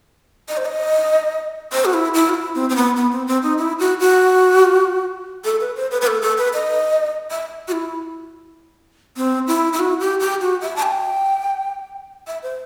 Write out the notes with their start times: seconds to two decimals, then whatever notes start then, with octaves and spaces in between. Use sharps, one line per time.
0.48 D#5
0.57 C5
0.65 D#5
1.73 C5
1.85 F#4
1.93 E4
2.14 E4
2.29 F#4
2.34 E4
2.55 C4
2.69 C4
2.76 B3
2.96 B3
3.12 C4
3.27 C4
3.43 D#4
3.58 E4
3.79 F#4
4.00 F#4
5.45 A4
5.60 B4
5.76 C5
5.91 B4
6.01 B4
6.07 A4
6.22 A4
6.38 B4
6.53 D#5
7.31 E5
7.68 F#4
7.72 E4
9.17 C4
9.47 E4
9.73 E4
9.79 F#4
10.00 G4
10.20 G4
10.41 F#4
10.61 E5
10.76 A5
10.83 G5
12.27 E5
12.43 C5